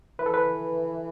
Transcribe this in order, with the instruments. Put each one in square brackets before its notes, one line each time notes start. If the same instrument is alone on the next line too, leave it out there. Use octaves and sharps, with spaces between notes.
[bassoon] E3 [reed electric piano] B4
[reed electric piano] A4
B4